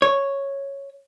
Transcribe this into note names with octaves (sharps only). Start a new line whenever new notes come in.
C#5